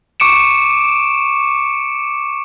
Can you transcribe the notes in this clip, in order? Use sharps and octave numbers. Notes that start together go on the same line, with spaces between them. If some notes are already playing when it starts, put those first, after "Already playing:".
C#6 D6 C#7 D7 E7